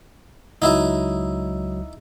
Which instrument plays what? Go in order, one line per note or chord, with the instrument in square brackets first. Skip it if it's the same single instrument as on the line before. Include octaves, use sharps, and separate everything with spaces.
[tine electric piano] C#2 F#3 [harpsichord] D#4 E4 E5